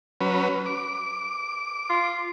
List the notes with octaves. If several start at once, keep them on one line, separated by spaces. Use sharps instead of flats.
F#3 C#4 B4
D6
F4